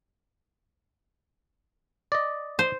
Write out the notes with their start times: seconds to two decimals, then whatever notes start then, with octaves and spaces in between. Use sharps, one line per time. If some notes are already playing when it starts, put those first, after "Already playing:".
2.12 D5 D#5
2.59 C5